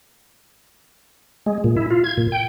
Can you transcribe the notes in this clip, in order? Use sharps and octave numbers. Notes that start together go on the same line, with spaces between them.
G#3
A#2
E4
F4
G#6
A#2
G5